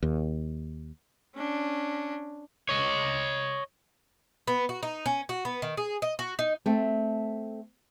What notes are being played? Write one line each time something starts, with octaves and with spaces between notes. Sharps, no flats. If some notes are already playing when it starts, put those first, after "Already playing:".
D#2
C#4 D4
C#5 D#5
B3
F#4
D#4
C#4
F#4
B3
D#3
G#4
D#5
F#4
D#4
A3 C4